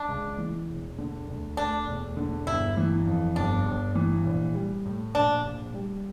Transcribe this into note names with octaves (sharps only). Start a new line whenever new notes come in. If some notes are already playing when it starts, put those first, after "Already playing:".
Already playing: D4
C#2
E3
E1
D3
D2
A3 D4
E1
D3
G1 E4
E3
F2
G1 D4
G1
E3
A#1
G3
A2
A#1 D4
A#1
G3